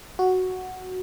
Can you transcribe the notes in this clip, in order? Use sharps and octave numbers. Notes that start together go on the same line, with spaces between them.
F#4